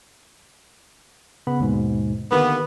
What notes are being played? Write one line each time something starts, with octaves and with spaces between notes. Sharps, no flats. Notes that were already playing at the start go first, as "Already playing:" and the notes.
C#3 B3 B5
D#2 G#2 B2
D3 D#3 A#3 B3 G4